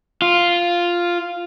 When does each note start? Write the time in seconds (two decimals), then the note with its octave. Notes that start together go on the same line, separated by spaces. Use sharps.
0.22 F4